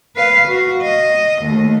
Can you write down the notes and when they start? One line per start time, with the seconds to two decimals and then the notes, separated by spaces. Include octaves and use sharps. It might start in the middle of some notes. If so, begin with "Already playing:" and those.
0.16 B4 F5
0.48 F#4
0.82 D#5
1.42 D#2 A3